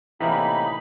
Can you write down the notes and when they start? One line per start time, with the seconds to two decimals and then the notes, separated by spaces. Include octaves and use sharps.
0.20 A2 C3 E3 A#3 D#4 B5